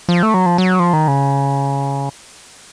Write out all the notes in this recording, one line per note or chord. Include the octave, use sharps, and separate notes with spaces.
F3
A3
F#3
F3
F#3
F3
D#3
C#3